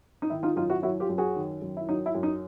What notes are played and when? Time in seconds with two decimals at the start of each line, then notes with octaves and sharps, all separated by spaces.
0.22 D#4
0.30 D#3 E4
0.43 D#4 F4
0.56 F#2 D#4 F4
0.69 E4 F#4
0.82 F#3 E4 F#4
1.00 F4 G4
1.09 F#2
1.18 F#4 G#4
1.36 D#3
1.62 F#2
1.77 E4
1.89 F#3 D#4
2.06 E4
2.15 F#2
2.23 D#4